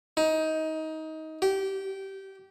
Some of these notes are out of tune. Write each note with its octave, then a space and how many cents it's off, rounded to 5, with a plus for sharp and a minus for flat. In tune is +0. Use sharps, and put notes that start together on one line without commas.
D#4 +20
G4 -20